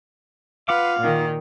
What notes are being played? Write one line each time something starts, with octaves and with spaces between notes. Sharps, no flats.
F4 B4 F5 F#5 D6
A#2 D#3